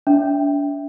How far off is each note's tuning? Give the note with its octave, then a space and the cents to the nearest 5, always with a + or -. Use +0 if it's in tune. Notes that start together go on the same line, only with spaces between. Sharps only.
D4 -35 E5 +0 G5 +0